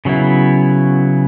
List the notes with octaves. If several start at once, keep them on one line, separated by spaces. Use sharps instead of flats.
C#3 F#3 B3 E4